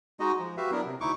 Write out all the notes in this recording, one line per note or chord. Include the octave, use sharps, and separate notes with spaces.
G#3 D#4 F#4 D#5
F3 G#3
F#4 G4 B4 E5 F5
F#3 B3 D4 E4 A#4
C3
D2 D#4 E4 C#6 D6